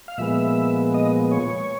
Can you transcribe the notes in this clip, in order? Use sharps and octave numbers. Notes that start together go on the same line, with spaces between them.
F5
A#2 F3 G#3 B3 E5
D#5
C#5